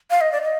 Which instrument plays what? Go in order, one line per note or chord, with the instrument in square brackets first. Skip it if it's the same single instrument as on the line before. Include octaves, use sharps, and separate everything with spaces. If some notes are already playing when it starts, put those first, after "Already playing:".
[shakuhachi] F5
D#5
D5
D#5